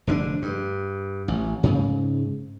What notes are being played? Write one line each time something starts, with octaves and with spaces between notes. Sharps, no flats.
F1 D3 C4 D4
G2
A1
G#2 C#3